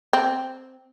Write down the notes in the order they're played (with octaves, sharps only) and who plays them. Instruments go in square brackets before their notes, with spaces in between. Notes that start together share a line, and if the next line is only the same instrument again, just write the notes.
[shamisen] C4